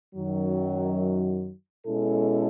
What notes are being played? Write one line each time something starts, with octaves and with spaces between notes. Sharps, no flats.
F#2 D#3 F#3
B2 G#3 C#4 E4 A4